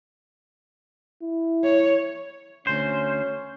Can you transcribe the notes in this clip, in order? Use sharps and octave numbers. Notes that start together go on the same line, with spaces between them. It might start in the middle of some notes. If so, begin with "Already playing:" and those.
E4
C#5
D2 C#4 C5